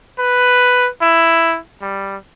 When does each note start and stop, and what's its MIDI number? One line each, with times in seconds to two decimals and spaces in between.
0.19 0.89 71
1.02 1.59 64
1.82 2.17 55